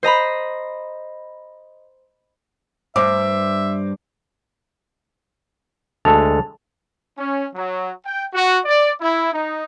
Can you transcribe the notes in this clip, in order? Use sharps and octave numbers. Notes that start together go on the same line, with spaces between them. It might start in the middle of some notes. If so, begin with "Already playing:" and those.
C5 D#5 A#5 B5
G2 C5 E5 D6
D2 G#3 A4 A5 A6 F7
C#4
F#3
G5
F#4
D5
E4
D#4